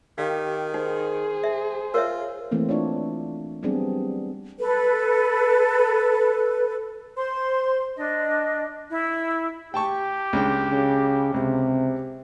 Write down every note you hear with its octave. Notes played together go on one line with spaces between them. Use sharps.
D#3 G4 F5
D#4 G#4 C5
E5
F4 A#4 C#5 E5
E3 A3 A#3 C4
D4 F4 C#5
F#3 G3 B3 C4 D4 G#4
A4 B4
C5 C6
D4 D#5
E4
G4 G5 A5 C#6
C#2 D4 G5
C#3
C#2 C3